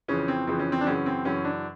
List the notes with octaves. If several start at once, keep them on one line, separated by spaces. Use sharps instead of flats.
F2 C#3 E3 C#4
C4
F2 C#3 E3 C4
C#4
C4
D4
F#2 C#3 E3 C#4
C4
F#2 C#3 E3 C#4
D4